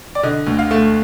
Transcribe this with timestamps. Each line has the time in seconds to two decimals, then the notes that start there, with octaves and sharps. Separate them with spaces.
0.15 D5
0.23 D3 D#5
0.47 D2
0.59 F5
0.71 A3